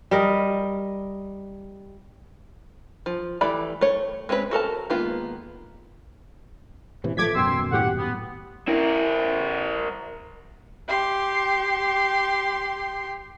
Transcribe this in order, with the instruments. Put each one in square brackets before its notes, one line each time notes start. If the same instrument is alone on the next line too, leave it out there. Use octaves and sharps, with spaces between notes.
[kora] G3 A#4 D#5
[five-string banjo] F3
E3 A3 G4 D5 B5
A3 C#5
G#3 C4 C#4 F#4 B4
F#4 A4 A#4 A5
D#3 G#3 A#3 B3 F4
[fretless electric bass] A2 C3 E3
[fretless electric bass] F3 G3 A3 [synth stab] D6 G#6 B6
[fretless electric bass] D#1 F#2 B2 [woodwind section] G5 C6 E6
[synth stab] A2 G4 [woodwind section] F#5
[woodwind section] B3
[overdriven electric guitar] E4 A#4
[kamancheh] G4 C6